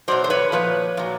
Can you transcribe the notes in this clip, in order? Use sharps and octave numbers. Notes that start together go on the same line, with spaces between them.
B2 F#3 C5 D5
C5
B4 C#5
A#2 F3 B4 C#5
A#2 F#3